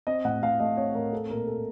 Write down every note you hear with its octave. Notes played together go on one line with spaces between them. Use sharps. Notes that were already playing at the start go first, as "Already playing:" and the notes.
C4 D#5
A2 F#5
A2 F5
A3 D#5
C4 C#5
A2 A#4
C4 A4
A#2 A#4
A#2 A4